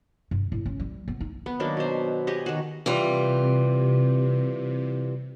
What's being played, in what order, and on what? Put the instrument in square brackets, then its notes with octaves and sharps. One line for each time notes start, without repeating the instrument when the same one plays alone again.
[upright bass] G2
A2
C#4
G3
B3
D#4
[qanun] B3
D#3 F#3 A#3 D4
B2 C5
G4 G#4 C#5 D#5
D#3 F#4
[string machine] C3 [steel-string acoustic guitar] E3 G3 F4